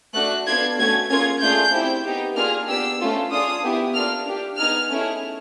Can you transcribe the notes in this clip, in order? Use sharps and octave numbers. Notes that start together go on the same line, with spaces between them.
A3 D4 F#4 A4 F#6
B3 D4 F4 A4 G#6
A3 C#4 F#4 G#6
A#3 C#4 F4 G#4 G#6
A3 D4 F4 G#4 G6
C4 E4 G4
B3 D#4 G4
A#3 D4 F4 G#4 F6
B3 D4 G4 E6
A3 C#4 F4 A4
D4 F4 G#4 D#6
B3 E4 G4
A#3 D4 F4 A4 F6
D4 G4
B3 D#4 G#4 F6
A3 C#4 E4 G#4